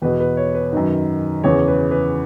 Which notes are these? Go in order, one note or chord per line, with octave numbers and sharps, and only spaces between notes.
E2 B2 B4
B4
C#5
B4
F#2 D#3
E2 C#3 E3 C#5
B4
B4